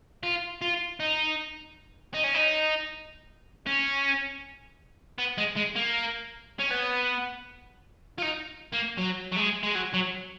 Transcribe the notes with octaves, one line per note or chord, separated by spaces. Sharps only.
F4
F4
D#4
D#4
C#4
D#4
C#4
B3
G#3
G#3
A#3
C#4
B3
F4
D#4
A#3
F#3
F#3
G#3
G#3
F#3
F#3